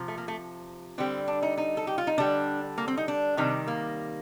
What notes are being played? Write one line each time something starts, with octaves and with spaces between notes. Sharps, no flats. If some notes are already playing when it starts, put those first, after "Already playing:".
Already playing: C3 F3
A3
A#3
A3
D3 G3 C4
D4
D#4
D#4
A4
G4
F4
D#4
D3 G3 D4
A#3
C4
D#4
D4
C3 D#3 G3
A#3